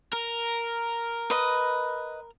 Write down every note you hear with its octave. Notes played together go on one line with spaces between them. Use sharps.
A#4
B4 D#5